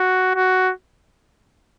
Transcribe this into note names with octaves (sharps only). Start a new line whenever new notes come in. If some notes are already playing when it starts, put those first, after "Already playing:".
Already playing: F#4
F#4